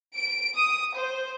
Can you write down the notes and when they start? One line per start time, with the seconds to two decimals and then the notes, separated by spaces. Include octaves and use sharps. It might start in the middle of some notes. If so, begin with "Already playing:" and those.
0.15 D7
0.58 D#6
0.96 C5